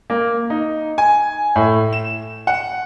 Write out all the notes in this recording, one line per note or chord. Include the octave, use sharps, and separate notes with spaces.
A#3
D#4
G#5
A2
E7
F#5